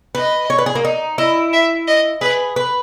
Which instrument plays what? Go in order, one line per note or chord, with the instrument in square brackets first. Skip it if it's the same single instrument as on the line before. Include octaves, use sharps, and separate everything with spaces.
[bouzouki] B4 [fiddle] D#5
[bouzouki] C#5
B4
G#4
A#3
D#4
[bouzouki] E4 [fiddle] D#5
[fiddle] E5
D#5
[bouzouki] G#4 [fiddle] B4
[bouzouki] B4